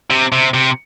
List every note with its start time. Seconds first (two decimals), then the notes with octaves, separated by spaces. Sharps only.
0.10 C3
0.32 C3
0.54 C3